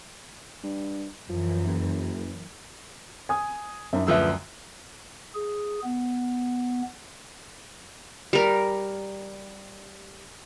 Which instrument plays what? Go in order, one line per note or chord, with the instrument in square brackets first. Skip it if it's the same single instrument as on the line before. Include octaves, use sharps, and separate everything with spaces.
[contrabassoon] G2
[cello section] F#2 E3 [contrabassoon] F3
[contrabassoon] F#1
[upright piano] G#5 D#6
[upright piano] F#2 [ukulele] D4 D#4 E5
[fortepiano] D2 F3 E6 [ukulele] G#4 B4 E5
[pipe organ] G#4
B3
[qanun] G3 A#4